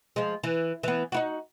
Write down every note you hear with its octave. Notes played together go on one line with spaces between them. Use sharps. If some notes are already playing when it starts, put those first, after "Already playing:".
F3 G#3
E3
E3 B3
D#4 E4 F#4